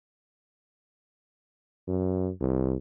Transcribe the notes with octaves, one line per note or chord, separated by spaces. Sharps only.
F#2
C2